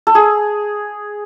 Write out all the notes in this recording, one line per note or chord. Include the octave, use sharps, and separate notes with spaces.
A4
G#4